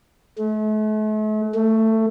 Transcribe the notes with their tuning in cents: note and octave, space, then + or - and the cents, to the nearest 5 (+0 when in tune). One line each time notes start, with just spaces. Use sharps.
A3 -40
A3 +15